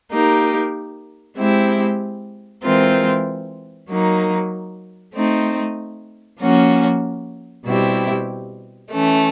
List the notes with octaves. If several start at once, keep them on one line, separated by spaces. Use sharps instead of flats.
A#3 D#4 G4 A#4
G#3 C4 E4 G4
E3 G#3 C4 F4 A#4
F#3 A#3 D#4
A3 C4 D#4
F3 A#3 C#4 F#4
B2 G3 C4 E4 G4
E3 A3 C#4